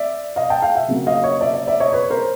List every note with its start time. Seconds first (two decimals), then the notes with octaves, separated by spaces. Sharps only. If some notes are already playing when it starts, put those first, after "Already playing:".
Already playing: D5 E5
0.36 D#5 F5
0.50 G5 A5
0.62 F5 G5
0.75 E5 F#5
0.88 C#3 F#3 A#3
1.07 D#5 F5
1.23 C#5 D#5
1.41 D5 E5
1.54 D5 E5
1.67 D5 E5
1.80 C#5 D#5
1.93 B4 C#5
2.10 A#4 C5